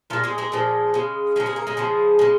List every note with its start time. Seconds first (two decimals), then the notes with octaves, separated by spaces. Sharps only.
0.10 A#2 F3 G#3 F4
0.24 G#3 G#4
0.38 G#3 G#4
0.52 A#2 F3 G#3
0.94 C#3 G#3
1.36 C#3 F3 G#3 C#4
1.46 G#3 G#4
1.56 A#3 A#4
1.67 G#3 G#4
1.77 C#3 F3 G#3
2.19 C#3 G#3